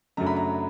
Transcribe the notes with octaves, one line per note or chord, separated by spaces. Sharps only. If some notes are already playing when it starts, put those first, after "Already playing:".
F#2 C#3 F#3 A3 D4 A#5
B5
A#5